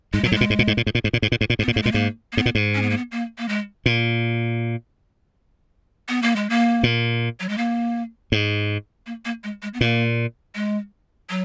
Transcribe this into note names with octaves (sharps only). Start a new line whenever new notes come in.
G#2 G#3
A#2 F#3
G#2 G#3
A#2
G#2
A#2
G#2
A#2
G#2
A#2
G#2
A#2
G#2
A#2
G#2
A#2
G#2 B3
A#2
G#2 A#3
A#2 G#3
G#2 A#3
A#3
G#2 B3
A#2
G#2
C#4
B3
A#3
B3
A#3
A#3
G#3
A#2
B3
A#3
G#3
A#3
A#2
F#3
G#3
A#3
G#2
A#3
A#3
G#3
G#3
B3
A#2 A#3
G#3
F#3